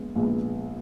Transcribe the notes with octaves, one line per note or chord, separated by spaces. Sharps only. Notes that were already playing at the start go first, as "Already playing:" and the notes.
Already playing: A#1 G#3 B3
A#1 A#2 G#3 B3